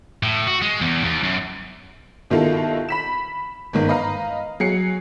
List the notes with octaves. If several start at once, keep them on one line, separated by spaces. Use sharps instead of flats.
A2
F#4
G#3
E2
D#2
F#2
B2 D#3 E4 F4 G4 A4
B5 B6 E7
G1 G#2 D#3
B4 D#5 F5 A#5
F#3 G#4 C7 C#7